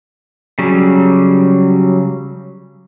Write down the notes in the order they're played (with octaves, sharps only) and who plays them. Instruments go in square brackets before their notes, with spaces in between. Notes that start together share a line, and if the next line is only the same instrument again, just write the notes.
[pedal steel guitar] C#3 F#3 G3